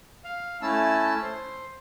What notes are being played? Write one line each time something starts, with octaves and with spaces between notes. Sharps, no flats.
F5
A3 C#4 E4 A5 E6
C5